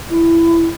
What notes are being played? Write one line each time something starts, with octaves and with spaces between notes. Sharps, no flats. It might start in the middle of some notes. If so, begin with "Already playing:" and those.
E4